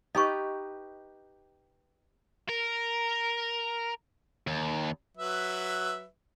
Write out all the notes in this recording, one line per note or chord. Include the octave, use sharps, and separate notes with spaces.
D#4 G4 B4 D#5 C#6
A#4
D#2
F#3 B4 E5